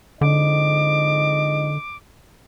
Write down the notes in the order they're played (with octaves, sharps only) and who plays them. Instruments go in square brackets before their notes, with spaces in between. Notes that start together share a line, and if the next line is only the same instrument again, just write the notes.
[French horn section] F2 G#2 D#5 [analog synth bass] D3 [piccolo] D6